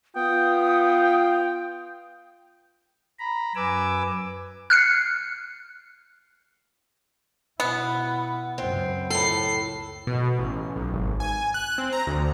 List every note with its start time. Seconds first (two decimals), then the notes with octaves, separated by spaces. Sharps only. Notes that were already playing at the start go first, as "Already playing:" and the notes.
0.16 B3 F4 G5 D#6
3.19 A#5 B5
3.56 F#2 B4 G#5 D6 E6
4.70 F6 F#6 C7 C#7
7.60 B2 B3 E4
8.58 C#2 F#2 C4
9.10 A2 A4 C7
10.07 B2
10.39 A1
10.76 B1
10.93 G#1
11.20 G#5
11.54 F#6
11.78 C4
11.93 A#5
12.07 D2